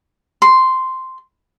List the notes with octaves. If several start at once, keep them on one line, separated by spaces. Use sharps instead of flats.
C6